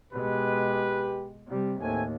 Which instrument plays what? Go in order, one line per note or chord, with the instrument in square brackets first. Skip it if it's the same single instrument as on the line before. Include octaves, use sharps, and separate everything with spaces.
[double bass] B2 G#3 [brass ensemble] G4 B4
[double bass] C3 G3
[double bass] D#2 A2 [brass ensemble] A3 C4 G#5